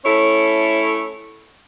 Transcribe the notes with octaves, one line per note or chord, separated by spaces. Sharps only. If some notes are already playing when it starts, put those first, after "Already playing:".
A3 C#4 E4 A4 C#5